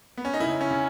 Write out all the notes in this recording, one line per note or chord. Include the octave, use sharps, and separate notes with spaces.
B3
C#4
D#4
C#3 E4
C#4
C#3